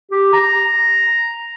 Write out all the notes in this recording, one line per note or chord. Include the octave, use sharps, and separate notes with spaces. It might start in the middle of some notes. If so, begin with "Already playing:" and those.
G4
A#5